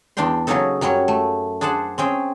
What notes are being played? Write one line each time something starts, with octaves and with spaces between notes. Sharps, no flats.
E2 D4 F5 G5 C6
C#3 F#3 A#3 C#4 D#4 A4
F#2 F#3 G3 C#4 C#5
A3
D4 G#4 C5 F#5 A5
C4 C#4 G#4 G5